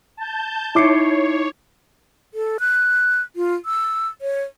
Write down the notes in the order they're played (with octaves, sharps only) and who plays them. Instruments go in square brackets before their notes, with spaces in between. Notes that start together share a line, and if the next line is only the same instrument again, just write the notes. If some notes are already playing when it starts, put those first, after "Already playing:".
[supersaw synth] A5 G6
[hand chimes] D#4 C7 C#7 [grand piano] E4 D6 [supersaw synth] C#5
[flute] A4
F#6
F4
E6
C#5